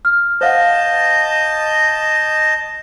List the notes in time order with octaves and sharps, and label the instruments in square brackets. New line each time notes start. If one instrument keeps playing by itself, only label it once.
[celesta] F6
[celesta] C5 F5 F#5 [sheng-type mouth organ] D#5 A5 G6